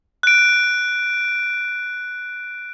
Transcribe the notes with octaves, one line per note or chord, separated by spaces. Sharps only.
F#6 D7